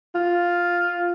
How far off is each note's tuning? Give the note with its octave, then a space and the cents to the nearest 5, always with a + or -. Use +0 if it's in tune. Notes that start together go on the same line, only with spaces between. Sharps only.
F4 +5